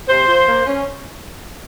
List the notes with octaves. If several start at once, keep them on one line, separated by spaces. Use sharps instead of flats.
C3 C5
F3
A#3
C#4